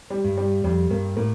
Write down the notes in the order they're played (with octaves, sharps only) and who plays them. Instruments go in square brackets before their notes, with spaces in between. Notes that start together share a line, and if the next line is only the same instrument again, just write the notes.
[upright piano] G3
[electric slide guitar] G2
[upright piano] G3
[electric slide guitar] F2 [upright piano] G3
[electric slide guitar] G2 [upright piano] A#3
[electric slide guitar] A2 [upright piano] A#3